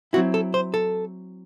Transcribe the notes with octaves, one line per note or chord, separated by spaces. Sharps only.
F#3 C4 E4 F#4
A4
C5
A4